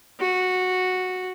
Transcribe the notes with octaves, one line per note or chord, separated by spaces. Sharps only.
F#4